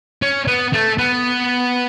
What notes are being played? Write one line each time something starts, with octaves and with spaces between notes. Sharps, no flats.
C#4
B3
A3
B3